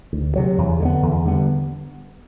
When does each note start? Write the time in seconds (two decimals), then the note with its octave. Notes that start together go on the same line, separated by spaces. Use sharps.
0.13 D2
0.36 C3 F#3
0.58 E2
0.80 D3 G3
0.85 B3
1.03 E2
1.25 D3 G3 B3